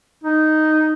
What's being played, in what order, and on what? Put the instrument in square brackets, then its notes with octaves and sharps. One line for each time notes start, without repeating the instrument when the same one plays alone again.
[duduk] D#4